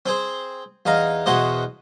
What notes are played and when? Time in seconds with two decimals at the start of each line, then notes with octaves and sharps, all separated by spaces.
0.06 C4 G#4 C5
0.86 E2 D#4 F5 A#5
1.26 E2 B2 F#4 C5 D#5